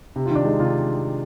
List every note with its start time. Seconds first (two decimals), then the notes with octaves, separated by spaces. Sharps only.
0.16 C3
0.26 F4
0.30 D#3
0.35 D4
0.44 G#3 D#4
0.60 C3 F4